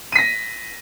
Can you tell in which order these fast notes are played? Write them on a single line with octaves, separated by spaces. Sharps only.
D#7 B6 A#6